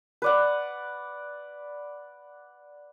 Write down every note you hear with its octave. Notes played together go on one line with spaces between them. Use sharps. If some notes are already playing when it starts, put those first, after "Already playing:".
B4 D5 F#5